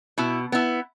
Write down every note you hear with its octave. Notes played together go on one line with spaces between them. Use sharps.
B2 E4
B3 E4